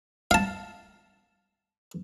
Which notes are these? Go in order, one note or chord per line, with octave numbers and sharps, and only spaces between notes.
F5 A5